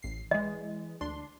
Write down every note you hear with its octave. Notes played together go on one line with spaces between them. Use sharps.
A1 C7
E3 G#3 D#5
D2 D4 C6